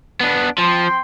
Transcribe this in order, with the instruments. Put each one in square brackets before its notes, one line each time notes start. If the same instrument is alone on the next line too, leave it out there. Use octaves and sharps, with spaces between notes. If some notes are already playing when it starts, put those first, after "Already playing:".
[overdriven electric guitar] B3 D4
[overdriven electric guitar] F3 [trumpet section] C4 G5 C6